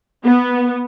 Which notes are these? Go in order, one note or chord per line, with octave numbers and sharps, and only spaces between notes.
B3